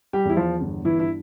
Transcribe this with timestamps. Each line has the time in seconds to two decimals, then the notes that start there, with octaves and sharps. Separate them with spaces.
0.13 G3 G4
0.25 E2 E4
0.37 F3 F4
0.60 G1
0.85 E3 E4
0.97 G2 E4